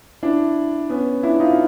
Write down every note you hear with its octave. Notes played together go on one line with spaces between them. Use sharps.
D4 E4
B3 C#4
D4 E4
D#4 F4